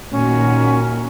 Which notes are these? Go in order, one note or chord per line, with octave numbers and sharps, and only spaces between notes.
A#2 D#3 C#4 F#4